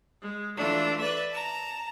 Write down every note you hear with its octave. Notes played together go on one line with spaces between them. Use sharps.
G#3
E3 A3 D4 F4
B4 D5 E5
A5 A#5